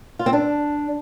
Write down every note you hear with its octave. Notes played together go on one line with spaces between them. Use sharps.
F4
C4
D4